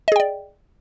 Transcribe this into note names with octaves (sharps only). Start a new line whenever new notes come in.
G#4 D5 D#5 G5